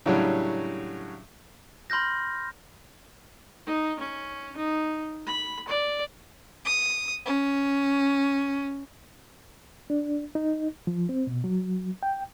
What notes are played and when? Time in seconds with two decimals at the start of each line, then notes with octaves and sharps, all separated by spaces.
0.06 A2 C#3 F#3 G3 C#4 D4
1.90 B5 C6 F6 G6 A#6
3.66 D#4
3.99 C#4
4.57 D#4
5.27 B5
5.68 D5
6.64 D#6
7.25 C#4
9.90 D4
10.35 D#4
10.87 F3
11.09 C4
11.27 B2
11.44 F#3
12.03 G5